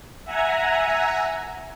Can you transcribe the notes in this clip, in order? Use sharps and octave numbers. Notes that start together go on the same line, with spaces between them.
E5 F#5 G#5 A#5